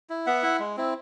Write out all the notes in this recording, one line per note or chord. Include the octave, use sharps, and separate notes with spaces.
E4
B3 E5 F#5
E4
G#3
C4 E4